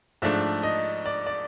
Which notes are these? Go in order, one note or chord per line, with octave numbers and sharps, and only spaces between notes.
G#2 F3 A3 D4 E5
D#5
D5
D5